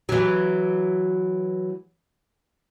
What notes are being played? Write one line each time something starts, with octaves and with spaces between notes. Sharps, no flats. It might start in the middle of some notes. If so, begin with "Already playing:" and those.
E3 F#3